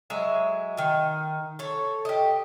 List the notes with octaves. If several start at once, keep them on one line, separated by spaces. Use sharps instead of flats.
F#3 G#3 E5
D#3 D#4
A4 C#5
G4 D#5